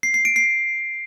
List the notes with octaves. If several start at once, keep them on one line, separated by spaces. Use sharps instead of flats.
C7
C7
D7
C7